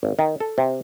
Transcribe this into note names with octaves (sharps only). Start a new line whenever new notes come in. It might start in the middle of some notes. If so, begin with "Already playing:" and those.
G#1
D#3
A4
C3